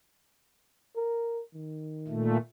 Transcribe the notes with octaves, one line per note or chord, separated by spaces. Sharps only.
A#4
D#3
A#2 A3